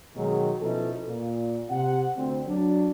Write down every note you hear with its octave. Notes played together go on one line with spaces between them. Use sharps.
B2 D#3 F#3 G#3
B2 F3 C#4 D#4 E4 A4
A#2
C3 F#5
D2 C4
F#3 D4